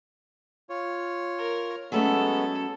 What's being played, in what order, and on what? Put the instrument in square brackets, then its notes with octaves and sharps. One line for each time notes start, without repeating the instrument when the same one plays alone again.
[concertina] F4 C#5
[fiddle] A#4
[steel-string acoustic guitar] F#3 A3 C#4 [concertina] G#3 B3 [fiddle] A4